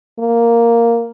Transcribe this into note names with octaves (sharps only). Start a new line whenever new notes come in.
A#3